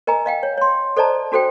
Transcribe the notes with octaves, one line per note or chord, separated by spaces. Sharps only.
A#4 D#5 G#5 A#5
D#5 F5 G5
C#5
C#5 C6
A4 C5 D5 D#5 A5 A#5
D4 F#4 A4 C5 G5